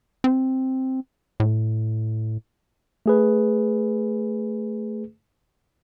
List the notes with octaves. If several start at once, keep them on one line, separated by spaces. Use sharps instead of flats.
C4
A2
A3 G#4 B4